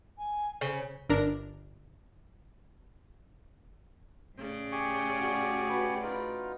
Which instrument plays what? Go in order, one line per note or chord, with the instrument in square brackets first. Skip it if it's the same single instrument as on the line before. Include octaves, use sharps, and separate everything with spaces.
[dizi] G#5
[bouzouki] C#3 [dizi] C5
[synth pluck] G1 D4 A#4
[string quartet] A2 C#3 D5
[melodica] G4 G#5 C#6
[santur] D4 F#4
F#4 B4
[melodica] D#4 F4 [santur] B4